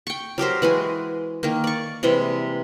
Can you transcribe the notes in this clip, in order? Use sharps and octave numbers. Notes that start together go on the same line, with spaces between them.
G5 C#6
F#3 G4 A#4 C5
E3 G#3 F#4 G#5
D#3 A#3
D5 C#6
C3 E3 G3 G#3